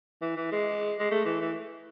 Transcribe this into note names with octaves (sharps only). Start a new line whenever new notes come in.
E3
E3
G#3
G#3
A3
E3
E3